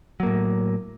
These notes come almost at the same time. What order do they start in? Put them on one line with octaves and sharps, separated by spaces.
F#3 A#3 A2